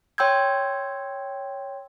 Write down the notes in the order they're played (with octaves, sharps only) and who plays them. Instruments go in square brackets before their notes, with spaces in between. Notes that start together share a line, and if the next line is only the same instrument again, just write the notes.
[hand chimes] C#5 G5 C6 E6 G6 G#6